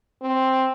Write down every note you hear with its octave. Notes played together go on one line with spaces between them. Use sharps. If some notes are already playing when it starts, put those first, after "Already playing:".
C4